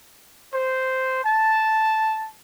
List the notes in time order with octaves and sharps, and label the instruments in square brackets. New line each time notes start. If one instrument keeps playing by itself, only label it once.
[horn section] C5
A5